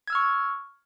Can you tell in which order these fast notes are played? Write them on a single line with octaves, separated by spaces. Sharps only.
G#6 E6 F6 C#6